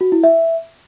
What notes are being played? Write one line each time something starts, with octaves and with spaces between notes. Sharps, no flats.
F#4
E4
E5